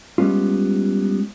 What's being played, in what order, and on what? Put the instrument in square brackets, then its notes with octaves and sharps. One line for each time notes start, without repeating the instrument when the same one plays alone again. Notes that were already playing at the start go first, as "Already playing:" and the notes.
[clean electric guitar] G3 G#3 B3 C#4 F4